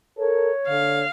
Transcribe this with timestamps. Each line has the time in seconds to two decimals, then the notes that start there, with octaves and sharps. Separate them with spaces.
0.18 A4 A#4 C#5
0.68 D3 F5